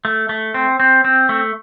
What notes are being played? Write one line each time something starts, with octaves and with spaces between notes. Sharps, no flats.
A3
A3
C4
C4
C4
A3